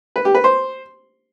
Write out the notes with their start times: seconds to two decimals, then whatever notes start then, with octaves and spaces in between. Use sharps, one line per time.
0.16 B4
0.25 G4
0.35 B4
0.44 C5